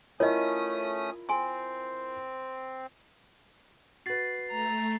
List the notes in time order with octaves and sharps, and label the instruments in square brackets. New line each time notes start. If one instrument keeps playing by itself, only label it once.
[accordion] A3 C#4 D#6 [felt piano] E4 F4 A#4 [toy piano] C#5 D#5
[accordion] C4 [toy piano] G#5 C6
[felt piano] F#4 B4 [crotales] A6 C7
[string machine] A3 [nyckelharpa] A#5